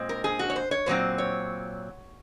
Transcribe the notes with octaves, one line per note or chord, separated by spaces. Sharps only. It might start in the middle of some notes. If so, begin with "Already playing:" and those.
Already playing: A#2 G#3 C4
A#4
G#4
F#4
C#5
C5
C#5
A#2 F#3 C4 C5
C#5